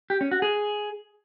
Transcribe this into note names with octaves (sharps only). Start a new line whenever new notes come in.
G4
C#4
F#4
G#4